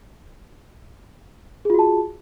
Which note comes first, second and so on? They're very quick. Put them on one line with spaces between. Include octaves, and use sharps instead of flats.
G#4 F4 F#4 A5